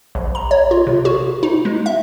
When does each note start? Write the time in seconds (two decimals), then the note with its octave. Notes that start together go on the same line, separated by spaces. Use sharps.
0.15 A#1
0.35 A#5
0.51 C#5
0.71 F4
0.87 C3
1.05 F#4
1.43 D#4
1.65 G#3
1.86 E5